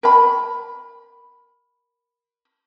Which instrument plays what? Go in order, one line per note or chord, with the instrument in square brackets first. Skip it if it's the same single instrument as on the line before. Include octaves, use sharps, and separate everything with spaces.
[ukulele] A#4 B5